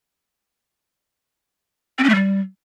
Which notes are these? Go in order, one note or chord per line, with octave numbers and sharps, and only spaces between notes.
C4
C#4
A3
G3